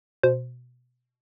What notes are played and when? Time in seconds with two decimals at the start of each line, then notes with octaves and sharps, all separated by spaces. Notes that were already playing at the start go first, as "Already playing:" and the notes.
0.23 B2 C5